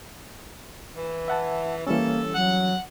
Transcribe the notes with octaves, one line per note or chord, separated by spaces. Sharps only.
E3
E5 F#5 A5
A2 E3 G3 A#3 C#4 A4
F#3 F#5